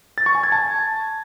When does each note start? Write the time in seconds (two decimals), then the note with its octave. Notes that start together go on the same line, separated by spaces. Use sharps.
0.18 A6
0.26 C#6
0.35 G#5
0.43 G#6
0.52 A5